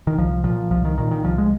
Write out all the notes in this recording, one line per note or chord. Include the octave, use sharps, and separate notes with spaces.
D#3
C2 F3
A#2 F3
C2 F3
D#3
A#2 D#3
D#3
C2 F3
G#3